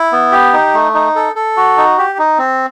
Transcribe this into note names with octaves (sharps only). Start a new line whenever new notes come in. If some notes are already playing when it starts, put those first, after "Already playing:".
Already playing: E4
B3
G4
D#4
A3
D#4
A4
A4
F#4
D#4
G4
D#4
C4